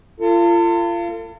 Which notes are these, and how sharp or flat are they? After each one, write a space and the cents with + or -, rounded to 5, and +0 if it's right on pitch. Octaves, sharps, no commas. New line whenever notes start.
F4 -30 A4 +40